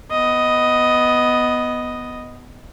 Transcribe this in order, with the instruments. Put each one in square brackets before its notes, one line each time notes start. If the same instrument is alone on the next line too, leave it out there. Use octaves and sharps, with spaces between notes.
[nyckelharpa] B3 D#5